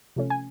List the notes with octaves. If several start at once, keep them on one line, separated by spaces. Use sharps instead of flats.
C3 F3 A3 C#4
G#5